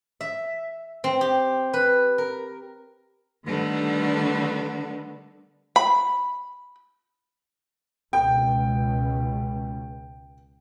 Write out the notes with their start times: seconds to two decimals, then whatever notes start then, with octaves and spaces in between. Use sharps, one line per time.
0.21 E5
1.04 C4
1.21 G4
1.73 B4
2.18 A#4
3.46 D3 D#3 G3 A3 B3 D4
5.76 B5
8.13 C#2 B2 G5